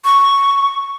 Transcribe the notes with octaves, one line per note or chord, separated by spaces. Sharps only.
C#6